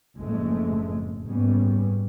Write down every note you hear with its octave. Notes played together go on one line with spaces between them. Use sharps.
F#1 F2 A2 G#3 A3
F#1 G#2 G3 B3 C#4